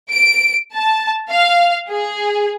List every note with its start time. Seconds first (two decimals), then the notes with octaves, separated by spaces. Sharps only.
0.11 D7
0.75 A5
1.30 F5
1.90 G#4